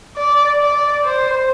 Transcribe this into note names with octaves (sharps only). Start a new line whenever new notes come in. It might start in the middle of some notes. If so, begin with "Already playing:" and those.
D5
D5
C5